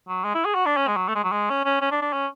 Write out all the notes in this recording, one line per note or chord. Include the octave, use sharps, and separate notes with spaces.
F#3
G#3
E4
G#4
F#4
D4
C#4
G#3
F#3
A3
G#3
F#3
G#3
C#4
C#4
C#4
D4
D4
C#4